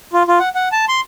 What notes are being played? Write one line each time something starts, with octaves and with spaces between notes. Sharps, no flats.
F4
F4
F#5
F#5
A5
C6